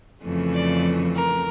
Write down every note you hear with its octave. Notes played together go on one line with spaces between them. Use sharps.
F2 C#3 E3 A3
D5
A#4